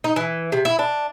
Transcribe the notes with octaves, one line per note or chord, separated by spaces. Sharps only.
D#4
E3
C3
E4
D4